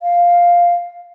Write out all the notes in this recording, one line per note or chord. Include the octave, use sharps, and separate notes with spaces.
F5